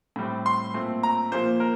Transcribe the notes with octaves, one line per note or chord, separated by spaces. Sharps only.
A2 G3 C4
C6
A#2 A3 C4
A#5
A#2 F3 A#3 C5
A#4